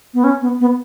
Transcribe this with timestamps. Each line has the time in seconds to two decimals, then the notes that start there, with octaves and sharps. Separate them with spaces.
0.14 B3
0.24 C#4
0.42 B3
0.60 B3